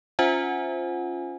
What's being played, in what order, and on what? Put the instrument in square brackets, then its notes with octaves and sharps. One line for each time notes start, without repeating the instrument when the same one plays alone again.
[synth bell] C#4 F4 C5 E5 F#5 G#5